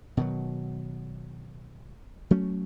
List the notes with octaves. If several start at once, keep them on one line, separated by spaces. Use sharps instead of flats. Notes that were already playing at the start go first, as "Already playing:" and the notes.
B2 D#3 F#3
F#3 A3 C#4